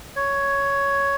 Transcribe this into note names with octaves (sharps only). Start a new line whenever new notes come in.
C#5